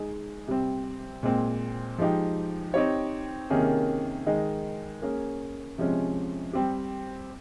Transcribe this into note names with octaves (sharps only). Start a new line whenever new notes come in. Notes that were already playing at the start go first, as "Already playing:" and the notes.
Already playing: G#3 D#4 G#4
C3 G3 C4
A#2 G#3 C4
F3 G#3 D#4 G4
C4 D#4 G4 C#5
C3 D#3 A#3 C#4 G#4
D#3 G#3 D#4
A#3 C#4 G#4
C3 F3 G#3 C#4
G3 C4 G4